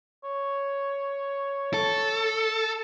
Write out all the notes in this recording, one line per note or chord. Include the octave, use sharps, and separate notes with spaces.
C#5
A4